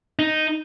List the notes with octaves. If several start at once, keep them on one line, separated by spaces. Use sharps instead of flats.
D#4